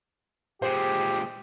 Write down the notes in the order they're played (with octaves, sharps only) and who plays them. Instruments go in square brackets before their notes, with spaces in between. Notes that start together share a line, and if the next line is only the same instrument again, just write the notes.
[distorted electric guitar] A#2 G#3 [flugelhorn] G4 [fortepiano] C5